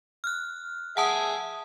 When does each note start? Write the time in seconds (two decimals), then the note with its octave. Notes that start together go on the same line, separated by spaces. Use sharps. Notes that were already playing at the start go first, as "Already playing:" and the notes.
0.24 F6 F#6
0.97 G#4 E5 F#5 A5 D#6